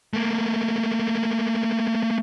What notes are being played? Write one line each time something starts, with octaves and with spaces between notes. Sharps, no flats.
A3 A#3